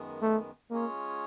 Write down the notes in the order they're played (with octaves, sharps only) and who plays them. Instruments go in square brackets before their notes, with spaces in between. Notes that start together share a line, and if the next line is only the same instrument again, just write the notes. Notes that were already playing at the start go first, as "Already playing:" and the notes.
Already playing: [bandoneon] F#2 D#3 G#3 B3
[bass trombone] A3
[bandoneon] G#3 C#4 F4 G#4 C#5 [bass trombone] A#3